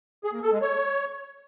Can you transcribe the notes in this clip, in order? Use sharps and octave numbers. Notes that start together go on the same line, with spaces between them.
G#4
A#3
A4
G#3
C#5